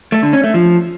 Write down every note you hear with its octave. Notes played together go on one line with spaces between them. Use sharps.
A3
D3
C#4
A3
F3